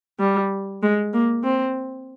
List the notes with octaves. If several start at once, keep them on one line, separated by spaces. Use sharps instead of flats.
G3
G#3
A#3
C4